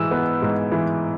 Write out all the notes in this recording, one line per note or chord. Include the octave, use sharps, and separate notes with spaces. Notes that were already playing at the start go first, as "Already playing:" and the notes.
Already playing: G#2 E3 E6
B3
G#2
E3